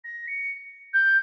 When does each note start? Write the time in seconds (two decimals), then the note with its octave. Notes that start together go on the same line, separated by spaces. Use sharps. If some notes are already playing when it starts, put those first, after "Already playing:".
0.04 A#6
0.27 C#7
0.93 G6